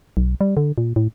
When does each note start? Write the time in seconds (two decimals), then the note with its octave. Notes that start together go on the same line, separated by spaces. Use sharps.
0.17 B1
0.41 G3
0.57 D3
0.78 A#2
0.96 A2